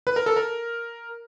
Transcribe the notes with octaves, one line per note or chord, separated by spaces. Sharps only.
B4
A#4
A4
A#4